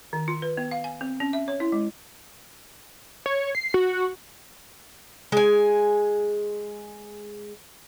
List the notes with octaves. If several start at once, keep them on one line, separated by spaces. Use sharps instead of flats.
D#3
F4
B4
B3
F5
G#5
C4
C#4
E5
C#5
E4
G#3
C#5
C7
F#4
G#3 G#5